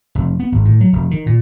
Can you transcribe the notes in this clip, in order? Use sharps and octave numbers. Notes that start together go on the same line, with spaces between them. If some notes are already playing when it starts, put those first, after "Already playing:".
F1
B3
G#1
A2
F#3
F1
D#3
A#2